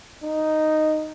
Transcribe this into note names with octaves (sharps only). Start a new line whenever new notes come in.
D#4